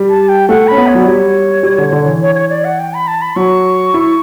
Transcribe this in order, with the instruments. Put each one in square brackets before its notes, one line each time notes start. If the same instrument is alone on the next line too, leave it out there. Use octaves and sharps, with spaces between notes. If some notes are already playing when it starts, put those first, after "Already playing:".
Already playing: [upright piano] G3
[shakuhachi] A5
G5
[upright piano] A3 [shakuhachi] F#5
[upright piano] C#4 [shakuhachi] B5
[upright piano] B3
[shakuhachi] C#5
[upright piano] F#3 [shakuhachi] D5
[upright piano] G3 [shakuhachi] C#5
[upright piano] G3
D3
D3
E3
[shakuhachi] C#5
C#5
D5
F#5
G5
B5
A5
B5
[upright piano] F#3 [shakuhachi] C#6
[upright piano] E4